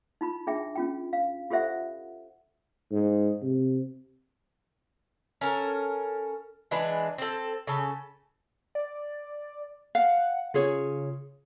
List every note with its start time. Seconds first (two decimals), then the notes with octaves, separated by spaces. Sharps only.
0.21 D#4 F4 B5
0.47 D4 G#4 E5 G5
0.75 C#4 F4 G5
1.13 F5
1.50 F4 G4 A4 C5 E5 F#5
2.91 G#2
3.42 C3
5.41 C#4 A4 A#4
6.71 E3 G#3 D4 B4
7.18 C4 A4
7.67 C#3 A4
8.75 D5
9.95 F5 F#5
10.54 C#3 F4 G#4 C#5